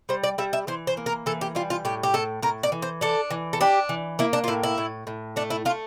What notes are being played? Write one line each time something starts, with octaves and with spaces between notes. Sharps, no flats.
G3 C5
D5
G3 E5
E5
E3 C5
C5
A#3
A#4
E3 A4
G4
G3 F4
F4
A2 G4
G4
A2 A4
A2 A#4
D5
E3
C5
D4 A4
E3
A4
D4 G4
E3
A#3 E4
D4
F4
A2 E4
E4
A2
A2
A3 D4
E4
A3 F4